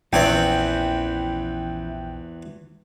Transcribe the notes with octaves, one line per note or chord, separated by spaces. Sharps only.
A#1 E2 E3 C4 C#4 E4 F#5 G5